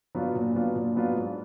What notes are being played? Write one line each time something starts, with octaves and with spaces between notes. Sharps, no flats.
F#3 B3 D4 F4
A#2
F#3 B3 D4 F4
A#2
F#3 B3 D4 F4
G#2